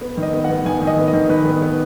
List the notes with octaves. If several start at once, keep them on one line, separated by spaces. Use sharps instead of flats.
B3
D#3
D#5
B3
F#5
B3
D#3 G#5
D#3
D#5
B3
D#5
D#3
D#3 B4
B3
B3